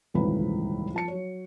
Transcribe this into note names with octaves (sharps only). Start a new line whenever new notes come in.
D#1 G#1 C#2 E3 B4 B5
F3 A5 C#7
F#3 C#5